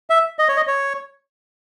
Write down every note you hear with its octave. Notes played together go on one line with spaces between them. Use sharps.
E5
D#5
C#5
D#5
C#5